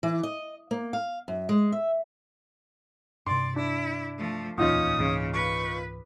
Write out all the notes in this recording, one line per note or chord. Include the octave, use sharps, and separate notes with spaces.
E3
D#5
A#3
F5
F#2
G#3
E5
G2 C3 D5 C6
D4 E4
F3 A3
D1 E2 A#2 E3 C#4 D#4 F4 D#6
C#2 G#2 C#3 E3
B4 C#6